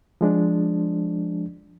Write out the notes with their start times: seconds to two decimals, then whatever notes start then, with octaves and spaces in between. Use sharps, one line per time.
0.21 F3 G#3 D4